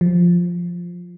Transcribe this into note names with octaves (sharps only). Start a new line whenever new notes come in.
F3